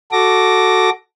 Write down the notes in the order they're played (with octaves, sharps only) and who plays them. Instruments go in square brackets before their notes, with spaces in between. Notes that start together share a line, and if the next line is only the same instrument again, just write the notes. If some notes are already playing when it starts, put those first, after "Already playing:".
[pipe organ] F#4 A4 D6 A#6